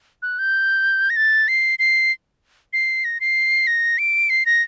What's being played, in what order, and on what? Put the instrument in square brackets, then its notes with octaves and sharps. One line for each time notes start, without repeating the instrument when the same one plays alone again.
[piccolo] F#6
G6
A#6
A6
C7
C7
C7
A#6
C7
A#6
D7
C7
A#6